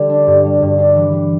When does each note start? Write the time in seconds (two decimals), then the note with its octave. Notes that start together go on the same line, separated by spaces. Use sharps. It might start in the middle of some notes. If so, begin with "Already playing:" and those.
Already playing: D3 G3
0.09 D4
0.27 G2
0.45 G3
0.62 G2
0.78 D4
0.96 E3
1.12 E3